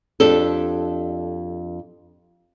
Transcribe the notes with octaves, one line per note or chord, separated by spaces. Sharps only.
F2 D4 G4 A4